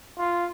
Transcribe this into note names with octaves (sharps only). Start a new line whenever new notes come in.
F4